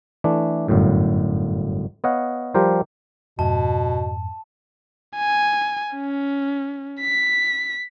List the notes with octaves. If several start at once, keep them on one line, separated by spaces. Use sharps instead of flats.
E3 A3 D4
G1 F#2 A2
B3 C#5 D#5 F5 F#5
F3 G3 G4 A#4 C5
F2 G#2 B2 A5
G#5
C#4
B6